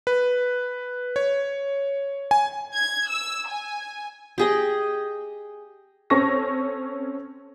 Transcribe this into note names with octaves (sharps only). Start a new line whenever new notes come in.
B4
C#5
G#5
G#6
E6
G#5
G4 G#4 D#5
C4 C#4 A4 C#5 C#6 A#6